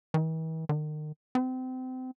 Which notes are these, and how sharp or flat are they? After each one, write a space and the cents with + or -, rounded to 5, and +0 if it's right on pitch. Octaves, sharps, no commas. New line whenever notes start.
E3 -45
D#3 -35
C4 -30